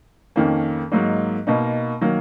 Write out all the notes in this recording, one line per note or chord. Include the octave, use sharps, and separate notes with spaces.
F2 D#3 A#3 C#4
G#2 F#3 A#3 D#4
B2 A#3 D#4
D#3 F#3 A#3